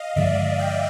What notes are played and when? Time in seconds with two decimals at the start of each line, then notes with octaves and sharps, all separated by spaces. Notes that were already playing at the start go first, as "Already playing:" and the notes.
Already playing: D#5 F5
0.16 G2 D3 F3 G#3 D5 E5
0.59 F5 G5